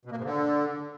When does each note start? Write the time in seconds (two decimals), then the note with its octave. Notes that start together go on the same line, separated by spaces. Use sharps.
0.05 B2
0.12 A#3
0.18 G#2
0.24 D3